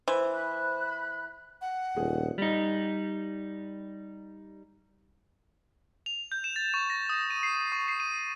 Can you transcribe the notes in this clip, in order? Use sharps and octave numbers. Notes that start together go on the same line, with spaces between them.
E3 C5
B5 F#6
F#5
D#1 A3 F4 G#4
G3 D#4
F7
G6
E7
A6
C#6
A#6
D#6
D#7
C7
C#6
C7
D#7